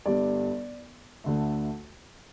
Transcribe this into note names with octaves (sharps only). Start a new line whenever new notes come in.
G1 G2 G3 D5
D2 D3 A3